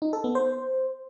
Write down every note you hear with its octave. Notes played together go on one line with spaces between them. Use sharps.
D#4
A4
B3
C5